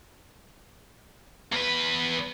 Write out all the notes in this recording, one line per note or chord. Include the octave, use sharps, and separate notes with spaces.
E2 B4